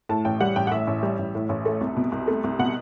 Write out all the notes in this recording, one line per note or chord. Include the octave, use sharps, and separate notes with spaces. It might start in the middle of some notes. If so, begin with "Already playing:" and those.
A2 A5
A1 G5
G3 F#5
A1 G5
F#5
A2 E5
A1
G3
A1
A2
A1
A3
C2
B2
C2
A3
C2
B2 F#5